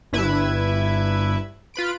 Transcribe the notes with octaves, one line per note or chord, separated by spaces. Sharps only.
G1 G2 E4 B4 E5 G#6
F4 B4 B5 D7